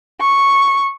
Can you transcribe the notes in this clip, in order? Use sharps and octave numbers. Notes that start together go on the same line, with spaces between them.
C#6